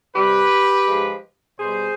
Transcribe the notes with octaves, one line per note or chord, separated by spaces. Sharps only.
C3 G3 G4 B4
G#2 F3 G#3
B2 G3 G#4 C5